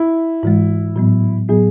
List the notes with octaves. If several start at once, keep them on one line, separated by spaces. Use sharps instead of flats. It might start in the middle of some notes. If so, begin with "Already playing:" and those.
Already playing: E4
G#2 E3 G#3
A2 F#3 B3
A2 F#3 B3 G#4